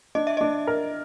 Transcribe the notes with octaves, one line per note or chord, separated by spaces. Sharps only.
D4 D#5
E5
D4 D#5
A#4